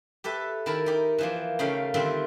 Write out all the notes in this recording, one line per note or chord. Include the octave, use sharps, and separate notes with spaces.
G4 A4 B4 E5
D#3 E4 A#4 A5 B5
D#4 G4
E3 F3 A#3
C#3 A3 D#4 F5 G5
D3 D#3 G3 C4 F4 E5